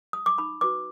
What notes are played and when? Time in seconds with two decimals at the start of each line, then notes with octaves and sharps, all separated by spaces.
0.13 D#6
0.26 D6
0.38 D#4 B5
0.61 F#4 B4 D6